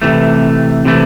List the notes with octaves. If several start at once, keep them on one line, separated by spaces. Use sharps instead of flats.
C3 E3 A3
C3 E3 A3